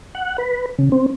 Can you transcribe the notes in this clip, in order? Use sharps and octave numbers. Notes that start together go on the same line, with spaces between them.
F#5
B4
C#3
C4